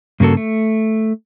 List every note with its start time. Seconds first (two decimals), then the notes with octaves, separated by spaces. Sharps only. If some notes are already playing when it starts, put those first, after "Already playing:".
0.20 G2 C#3 A#3 F#4 A4
0.37 A3